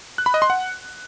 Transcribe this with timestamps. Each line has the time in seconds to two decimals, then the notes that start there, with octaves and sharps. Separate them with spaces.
0.18 F#6
0.26 B5
0.34 D#5
0.42 C6
0.50 F#5